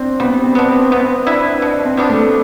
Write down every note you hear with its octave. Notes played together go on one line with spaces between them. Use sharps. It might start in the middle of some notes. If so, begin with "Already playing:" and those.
Already playing: C4 D4
G3 B3
C4
B3 D4
C4
B3 C4
D4 E4 B4
B2 D4
C4
G3 B3 D4
A3